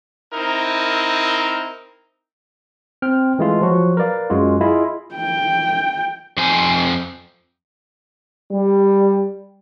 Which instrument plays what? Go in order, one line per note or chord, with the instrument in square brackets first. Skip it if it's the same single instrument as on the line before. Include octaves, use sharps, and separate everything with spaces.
[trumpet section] C4 D#4 E4 A#4
[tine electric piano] C4 G5 F6
E3 G#3 A3 F4
F3 F#3 F#4
A#4 B4 D5 F5
F#2 G#3 F4 F#4
E4 F4 G#4 D#5
[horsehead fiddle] G5
[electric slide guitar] F2 C4 C5 G#5
[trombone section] G3